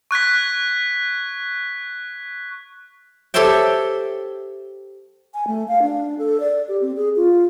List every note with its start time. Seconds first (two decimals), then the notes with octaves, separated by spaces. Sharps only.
0.11 C#6 F#6 G#6 B6
3.34 G4 A4 C5 C#5 E5 G5
5.34 G#5
5.47 A3
5.68 F5
5.82 D4
6.19 A4
6.40 D5
6.68 G4
6.81 C4
6.96 G#4
7.16 F4